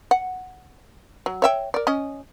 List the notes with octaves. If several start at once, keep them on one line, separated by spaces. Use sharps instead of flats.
F#5
F#3
C#5 E5 G5
A#4 D5
C#4 D#5